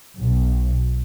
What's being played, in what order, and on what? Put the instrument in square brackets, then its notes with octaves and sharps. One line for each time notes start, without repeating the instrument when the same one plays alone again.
[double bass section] B1